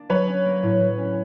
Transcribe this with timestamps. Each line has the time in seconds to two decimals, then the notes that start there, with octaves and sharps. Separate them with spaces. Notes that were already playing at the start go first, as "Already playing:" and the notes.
Already playing: A#3 D4
0.09 F#3 B4 C#5
0.27 C#4
0.46 A#3
0.63 A2
0.80 F#3
0.98 C#4